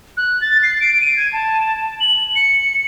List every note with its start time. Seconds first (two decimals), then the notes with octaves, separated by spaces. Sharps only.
0.17 F#6
0.41 A6
0.63 C7
0.80 D7
1.01 D#7
1.17 G#6
1.33 A5
2.00 F#7
2.36 C#7